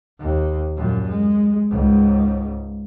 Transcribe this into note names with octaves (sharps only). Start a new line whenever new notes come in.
D#2
F#2 A#2
G#3
C#2 G#2